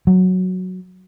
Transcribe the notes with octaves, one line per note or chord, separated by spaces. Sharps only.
F#3